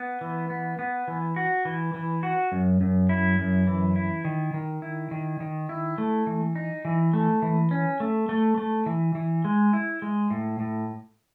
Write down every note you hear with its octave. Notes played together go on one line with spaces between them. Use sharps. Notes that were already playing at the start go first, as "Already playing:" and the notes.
Already playing: B3
E3
B3
B3
E3
F#4
E3
E3
F#4
F#2
F#2
E4
F#2
E3
E4
D#3
D#3
E4
D#3
D#3
E4
A3
E3
D#4
E3
A3
E3
C#4
A3
A3
A3
E3
E3
G#3
E4
G#3
A2
A2